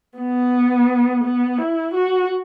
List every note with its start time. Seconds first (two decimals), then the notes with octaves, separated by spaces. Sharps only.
0.18 B3
1.23 B3
1.58 E4
1.94 F#4